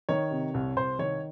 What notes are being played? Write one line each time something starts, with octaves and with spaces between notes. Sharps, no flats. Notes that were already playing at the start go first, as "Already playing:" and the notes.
D#3 C#5
C3
C2
C2 C5
D#3 C#5